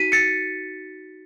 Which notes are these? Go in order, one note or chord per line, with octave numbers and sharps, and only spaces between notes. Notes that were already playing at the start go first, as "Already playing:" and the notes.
Already playing: D#4 F#4 B6 D#7
A6 C#7